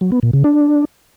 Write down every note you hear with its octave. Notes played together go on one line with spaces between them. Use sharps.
F#3
B3
A#2
C#3
D4